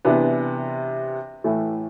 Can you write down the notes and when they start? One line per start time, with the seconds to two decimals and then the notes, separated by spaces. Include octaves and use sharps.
0.05 C3 E3 B3 D4
1.44 A2 E3 A3